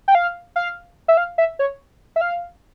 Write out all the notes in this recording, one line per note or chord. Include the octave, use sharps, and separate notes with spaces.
G5
F5
F5
E5
F5
E5
C#5
E5
F5